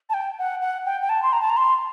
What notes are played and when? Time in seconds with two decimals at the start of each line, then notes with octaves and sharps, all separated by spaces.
0.10 A5
0.14 G5
0.39 F#5
0.61 F#5
0.86 G5
1.01 G5
1.09 A5
1.23 C6
1.33 A#5
1.41 A5
1.50 A#5
1.57 C6